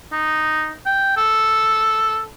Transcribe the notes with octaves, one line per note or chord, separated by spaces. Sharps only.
D#4
G5
A4